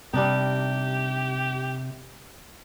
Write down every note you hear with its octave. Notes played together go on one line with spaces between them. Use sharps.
C3 G3 D4 D#4 G4